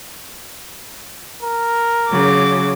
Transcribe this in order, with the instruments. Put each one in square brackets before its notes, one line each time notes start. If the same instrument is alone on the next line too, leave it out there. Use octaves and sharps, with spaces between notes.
[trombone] A#4
[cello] C#3 F#3 [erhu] D6